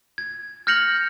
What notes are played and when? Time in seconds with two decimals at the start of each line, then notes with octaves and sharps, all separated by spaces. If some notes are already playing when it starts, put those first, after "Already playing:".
0.18 G#6
0.67 F6 G6 A#6 C#7 F7 F#7